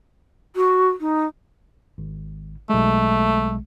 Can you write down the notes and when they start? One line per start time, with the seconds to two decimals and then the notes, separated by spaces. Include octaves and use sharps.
0.56 F#4
1.01 D#4
1.98 G#1
2.70 B1 G#3 A3